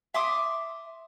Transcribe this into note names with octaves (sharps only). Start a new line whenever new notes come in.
E5 C6 D6 D#6